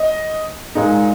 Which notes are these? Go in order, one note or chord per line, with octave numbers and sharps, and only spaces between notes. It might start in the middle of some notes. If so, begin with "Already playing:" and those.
Already playing: D#5
A#2 G#3 D#4